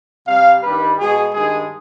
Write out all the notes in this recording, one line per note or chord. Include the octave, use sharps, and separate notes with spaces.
C3 G3 F5
G2 D#3 G3 B4
B2 G#3 G#4
G2 D#3 G#3 G#4